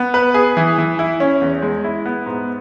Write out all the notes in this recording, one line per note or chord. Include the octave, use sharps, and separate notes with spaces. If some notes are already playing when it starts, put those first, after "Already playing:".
Already playing: B3
B4
G#4
E3
E3
E4
C#4
E2
G#3
E4
B3
G#2